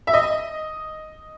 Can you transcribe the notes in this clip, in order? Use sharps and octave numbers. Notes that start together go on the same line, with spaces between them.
E5
D#5